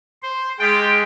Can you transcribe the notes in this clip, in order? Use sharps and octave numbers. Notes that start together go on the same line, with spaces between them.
C5
G#3 F4 G4 G5